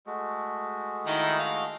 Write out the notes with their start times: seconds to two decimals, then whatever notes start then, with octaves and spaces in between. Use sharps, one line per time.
0.07 G#3 A3 F#4
1.07 D#3 D#4 E4
1.39 F5